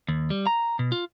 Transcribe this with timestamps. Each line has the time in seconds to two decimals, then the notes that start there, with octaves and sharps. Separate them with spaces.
0.09 D#2
0.30 G3
0.47 A#5
0.79 B2
0.92 F4